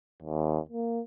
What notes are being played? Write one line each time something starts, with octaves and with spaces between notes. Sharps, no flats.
D#2
A#3